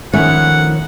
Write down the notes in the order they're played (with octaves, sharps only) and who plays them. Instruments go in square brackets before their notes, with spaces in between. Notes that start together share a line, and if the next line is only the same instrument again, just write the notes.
[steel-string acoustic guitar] D#3 F3 C#5 [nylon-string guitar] A3 C#4 E4 [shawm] F#5